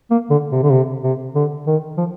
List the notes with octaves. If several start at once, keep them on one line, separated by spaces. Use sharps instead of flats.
A#3
D3
C3
D3
C3
C3
D3
D#3
F3